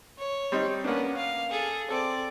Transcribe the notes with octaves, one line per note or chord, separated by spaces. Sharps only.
C#5
G3 C4 D#4
A#3 B3 C#4 D4
F5
G#4 A4
C4 A4 D5